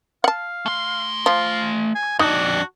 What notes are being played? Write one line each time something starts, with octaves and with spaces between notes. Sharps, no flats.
F5 F#5 A5
A3 C6
F3 F4
G#5
F2 D4 D#4 F#4